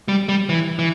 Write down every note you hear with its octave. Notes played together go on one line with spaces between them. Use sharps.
G3
G3
E3
E3